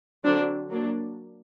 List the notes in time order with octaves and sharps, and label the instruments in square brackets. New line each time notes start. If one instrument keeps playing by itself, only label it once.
[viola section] D3 F#3 C4 D4
F#3 A#3 D4